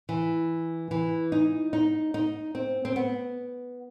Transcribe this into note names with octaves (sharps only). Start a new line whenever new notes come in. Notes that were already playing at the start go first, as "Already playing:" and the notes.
E3
E3
D#4
D#4
D#4
C4
C4
B3